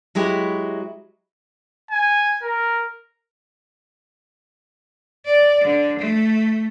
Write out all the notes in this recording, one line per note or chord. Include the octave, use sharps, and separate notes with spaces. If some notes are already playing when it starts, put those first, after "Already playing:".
F#3 G#3 E4 G4
G#5
A#4
D5
D3
A3